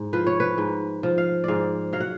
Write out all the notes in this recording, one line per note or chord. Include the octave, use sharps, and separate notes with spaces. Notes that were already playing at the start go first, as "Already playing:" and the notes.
Already playing: G#2
F3 B4
C#5
B4
G#2
F3
F5
G#2 D5 F5
F#3 F5
F#5